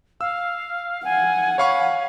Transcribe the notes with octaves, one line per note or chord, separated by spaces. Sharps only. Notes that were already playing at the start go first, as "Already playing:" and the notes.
F5 E6
F#5 G#5
C#5 F5 B5 C#6